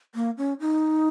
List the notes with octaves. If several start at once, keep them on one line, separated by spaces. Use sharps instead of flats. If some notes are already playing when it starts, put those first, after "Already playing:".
A#3
C#4
D#4